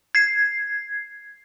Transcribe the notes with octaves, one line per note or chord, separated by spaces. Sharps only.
G#6 C7